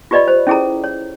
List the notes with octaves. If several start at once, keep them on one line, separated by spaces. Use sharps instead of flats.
F4 G4 B4 D5 D#5 B5
C5
C#4 E4 G#4 A4 A#5
C#5